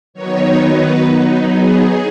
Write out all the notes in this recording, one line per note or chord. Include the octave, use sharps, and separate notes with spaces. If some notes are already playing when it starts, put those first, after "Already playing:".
D#3 F#3 B3 D#4 C#5
B4
F#3 B3 D#4
G#4